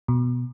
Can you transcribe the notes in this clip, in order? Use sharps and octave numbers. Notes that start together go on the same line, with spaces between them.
B2